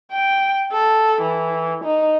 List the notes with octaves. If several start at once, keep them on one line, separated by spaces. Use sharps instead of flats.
G5
A4
E3
D#4